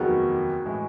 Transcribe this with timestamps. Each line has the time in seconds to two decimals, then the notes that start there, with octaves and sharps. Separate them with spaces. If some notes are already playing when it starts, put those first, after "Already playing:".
Already playing: F1 D#2 D#3 F#3 B3 F#4 G#4
0.66 A2 E3 G#3